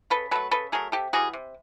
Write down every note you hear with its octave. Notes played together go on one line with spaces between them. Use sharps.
C#3 A4 B4
F#3 A3 A4 B4
C#3 A4 B4
F#3 A3 G#4 A#4
C3 G4 A4
E3 G3 F#4 G#4
C3